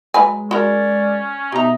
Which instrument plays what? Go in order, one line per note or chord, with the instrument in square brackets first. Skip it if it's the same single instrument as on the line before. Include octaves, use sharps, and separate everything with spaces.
[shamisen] F#3 B4 G#5 [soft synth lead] G#3
[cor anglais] C#4 [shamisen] F#4 A#4 [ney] D5
[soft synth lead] B2 [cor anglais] D#4 [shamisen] G4 A#5 [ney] E5